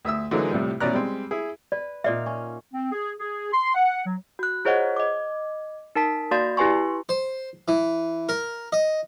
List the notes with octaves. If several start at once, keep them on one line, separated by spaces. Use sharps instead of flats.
D2 E5 D#6 E6
D3 E3 F#3 G#3 A#3 D#4
C2 A2 C3 F3 G3
A1 B2 C#4 D5 A#5 F#6
G3 G#3 C4
E4 G#4
B4 D5
A#2 D#4 D5 E5 F5
C#4
C4
G#4
G#4
C6
F#5
F#3
F#4 F#6
F4 G#4 C5 C#5 D#5 F#5
D#5 D6
D#4 A#4 A5 B6
A#3 F#4 D5 F5 C6 A6
E4 G4 B4 G#5 C6 C#6
C5
E3
A#4
D#5